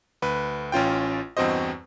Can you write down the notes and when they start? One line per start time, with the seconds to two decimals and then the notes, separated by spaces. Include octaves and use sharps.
0.22 D2 B4
0.72 A1 C#4 F4 G5
1.37 E2 G2 C4 F#4 C5 D#5